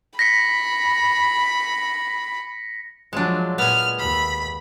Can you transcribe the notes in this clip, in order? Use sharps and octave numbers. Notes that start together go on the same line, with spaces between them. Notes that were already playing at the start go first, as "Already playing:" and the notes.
B5 A#6 B6 C#7
F3 F#3 G#3 D4
A#2 B3 G#5 F6
D#2 B5